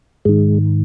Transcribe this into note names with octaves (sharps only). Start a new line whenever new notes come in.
G#2 D#3 G#3